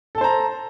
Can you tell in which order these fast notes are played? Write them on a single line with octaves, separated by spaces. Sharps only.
A4 A5 C5 A#5